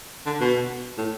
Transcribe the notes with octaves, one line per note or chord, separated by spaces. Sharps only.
D3
B2
A2